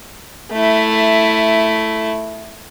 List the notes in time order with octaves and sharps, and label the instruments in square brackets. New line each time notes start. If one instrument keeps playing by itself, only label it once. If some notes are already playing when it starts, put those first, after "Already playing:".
[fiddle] A3 E4